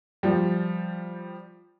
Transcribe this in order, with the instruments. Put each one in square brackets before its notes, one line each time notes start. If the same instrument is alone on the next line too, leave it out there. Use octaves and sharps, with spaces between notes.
[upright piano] F3 G3